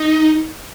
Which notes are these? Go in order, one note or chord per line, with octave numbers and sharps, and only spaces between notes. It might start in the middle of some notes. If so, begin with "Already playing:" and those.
Already playing: D#4